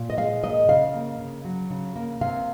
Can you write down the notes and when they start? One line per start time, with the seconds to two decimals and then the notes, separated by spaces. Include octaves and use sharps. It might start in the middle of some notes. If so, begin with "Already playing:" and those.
Already playing: A#2
0.10 D#5
0.17 G#3 F5
0.43 A#2 D#5
0.68 C#3 F5
0.94 A#3
1.19 C#3
1.45 F#3
1.70 C#3
1.96 A#3
2.21 C3 F5